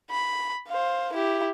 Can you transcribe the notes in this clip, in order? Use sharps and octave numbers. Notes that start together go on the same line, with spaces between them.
B5
C5 F5
E4 G4